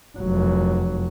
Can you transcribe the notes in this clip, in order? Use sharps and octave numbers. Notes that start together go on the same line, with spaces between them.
F1 F#3